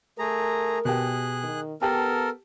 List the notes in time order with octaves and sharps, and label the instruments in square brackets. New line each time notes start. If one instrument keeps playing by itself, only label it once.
[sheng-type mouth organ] A3 G#4 A#5 [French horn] A#4
[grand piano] B2 G4 [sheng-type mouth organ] G#4 F#6
[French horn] D#3
[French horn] B3 [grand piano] G4 A5 [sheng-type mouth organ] A4 A#4